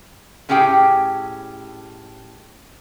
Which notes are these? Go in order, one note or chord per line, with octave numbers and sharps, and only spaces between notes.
A2 C#4 G4 G#4 G5